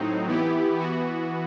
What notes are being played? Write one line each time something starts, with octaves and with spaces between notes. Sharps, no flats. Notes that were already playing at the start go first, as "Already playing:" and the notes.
Already playing: A2 F#3 C4 D#4
E3 B3 E4 G4
E3 B3 F#4